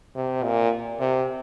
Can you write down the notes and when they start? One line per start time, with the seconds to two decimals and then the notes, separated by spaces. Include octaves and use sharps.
0.15 C3
0.44 A#2
1.00 C3